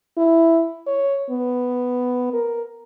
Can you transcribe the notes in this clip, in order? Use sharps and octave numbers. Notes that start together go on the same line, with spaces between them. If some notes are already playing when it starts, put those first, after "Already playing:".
E4
C#5
B3
A#4